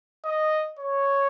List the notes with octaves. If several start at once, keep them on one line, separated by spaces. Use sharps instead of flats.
D#5
C#5